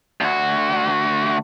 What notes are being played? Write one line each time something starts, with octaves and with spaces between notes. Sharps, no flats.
D2 F#4